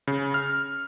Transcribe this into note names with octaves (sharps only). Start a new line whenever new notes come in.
C#3
F6